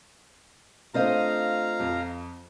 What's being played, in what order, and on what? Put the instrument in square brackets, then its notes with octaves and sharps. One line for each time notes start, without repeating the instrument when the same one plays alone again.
[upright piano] A3 C4 D4 [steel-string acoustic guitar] F4 C5 D#5 [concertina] F5 A#5
[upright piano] F2